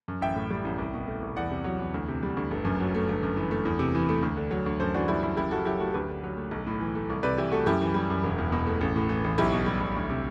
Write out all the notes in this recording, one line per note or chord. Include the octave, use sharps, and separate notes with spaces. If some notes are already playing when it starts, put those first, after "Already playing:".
F#2
A1 E5 G5
A2
G3
A1
C2
B2
A3
C2
E2 D5 F#5
C3
F#3
E2
D2
C3
G3
D2
G1
F#2
F#3
A3
G1
F#2
E3
A3
E2
C3
E3
A3
D2
D3
F#3
D2
F#2 A4 C5
E3 D4 F#4
G3 E4
F#2 E4
F#1 E4 G4
F#2 F#4 A4
F#3 E4 G4
A3 F#4 A4
A4
D2 G4 B4
D3
F#3
A3
B1
A2
E3
A3
C2
C3 B4 D5
E3 E4 G4
A3 F#4 A4
F#2 E4 G4
E3
G3
F#2
E1
E2
B2
A3
A1
A2
E3
A1
B1 E4 G4
B2
G3
B1
D2
C3